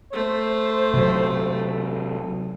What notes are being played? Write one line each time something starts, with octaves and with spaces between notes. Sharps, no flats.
A3 C5
C3 F#3